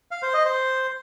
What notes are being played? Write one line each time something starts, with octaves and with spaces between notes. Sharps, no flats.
F5
C5
D#5
C5